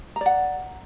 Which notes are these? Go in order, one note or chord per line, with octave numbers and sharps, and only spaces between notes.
D5 F#5 A#5